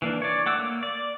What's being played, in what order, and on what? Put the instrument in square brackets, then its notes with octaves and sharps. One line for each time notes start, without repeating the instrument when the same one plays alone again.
[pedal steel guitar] E3 A#3 D4
C#5 D5
A3 F#5 D6 E6
A#3
D5